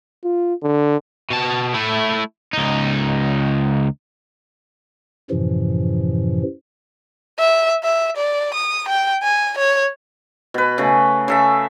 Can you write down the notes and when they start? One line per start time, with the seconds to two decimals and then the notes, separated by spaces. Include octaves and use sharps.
0.24 F4
0.63 D3
1.31 B2 A5
1.74 A3 E4
2.53 C#2 D#4
5.30 F#2 A2 C3 E3 F3
7.39 E5
7.84 E5
8.17 D5
8.55 D#6
8.88 G5
9.22 G#5
9.58 C#5
10.54 B2 B4
10.78 C#3 A3
11.28 C#3 A4 E5